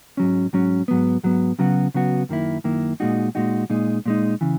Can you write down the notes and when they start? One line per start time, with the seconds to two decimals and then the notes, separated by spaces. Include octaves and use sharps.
0.17 G#2 F#3 C#4
0.53 G#2 F#3 C#4
0.88 G#2 F#3 B3
1.24 G#2 F#3 B3
1.59 C#3 F#3 B3 F#4
1.94 C#3 F#3 B3 F#4
2.29 F#2 D#3 A#3 E4
2.64 F#2 D#3 A#3 E4
3.00 A#2 G#3 D#4 F#4
3.35 A#2 G#3 D#4 F#4
3.70 A#2 G#3 D#4
4.06 A#2 G#3 D#4
4.41 C#3 E3